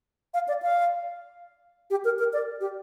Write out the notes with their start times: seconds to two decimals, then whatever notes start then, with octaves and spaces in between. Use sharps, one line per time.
0.34 F5
0.48 D5
0.62 F5
1.90 G4
2.04 A#4
2.19 A#4
2.33 D5
2.61 G4